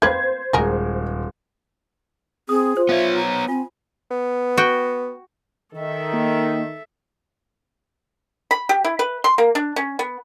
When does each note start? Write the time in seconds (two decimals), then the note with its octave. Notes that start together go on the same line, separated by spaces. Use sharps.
0.02 A#3 C4 B4 C5 G#6
0.53 D#1 G#3 F#4 G#4 A#4
2.49 C4 G#4 D#6
2.77 F4 C5
2.89 B3 C#5 E5 F5
3.16 A#5
3.48 C4 F4 G#5
4.11 B3
4.58 F#4 G5
5.74 D#3 A4 E5
6.13 A#3 D#4
8.51 B5
8.69 G4
8.84 E4
8.99 B4
9.24 C6
9.38 A#3
9.55 D4
9.76 C#4
9.99 B3